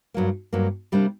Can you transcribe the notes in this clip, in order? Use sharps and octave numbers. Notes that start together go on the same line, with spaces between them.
G2 F#3 A#3
G2 F#3 A#3
C3 G3 A#3 D4